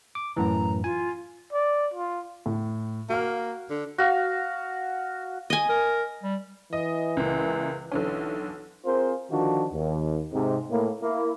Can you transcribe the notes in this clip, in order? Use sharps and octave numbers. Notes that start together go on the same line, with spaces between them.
D6
F#2 A2 E3 A#5
F4 G#5
D5
F4
A2
A#3 F#4 F6
D3
F#4 F5
D#5 G#5
A#4
G3
E3 D#5
C#2 A#2
B1 D3 E3 C#4
C4 F4 G#4 A#4 C5
D3 D#3 F3 D4 F4 F#4
D#2
G#2 C3
A2 A#3
A#3 E4